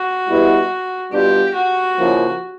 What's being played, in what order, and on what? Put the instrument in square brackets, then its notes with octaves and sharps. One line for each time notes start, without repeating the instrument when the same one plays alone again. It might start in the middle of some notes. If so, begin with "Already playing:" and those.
Already playing: [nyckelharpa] F#4
[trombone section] B2 G3 B3 E4
[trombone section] B2 G3 B3 D4 F4 [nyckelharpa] G4
[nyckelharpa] F#4
[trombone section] C#3 F3 A#3 C#4 E4